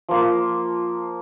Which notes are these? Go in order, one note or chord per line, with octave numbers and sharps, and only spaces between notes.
F3 A#3 F4